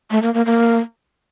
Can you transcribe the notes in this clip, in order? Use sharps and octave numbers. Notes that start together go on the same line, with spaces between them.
A3
A#3
A#3
A#3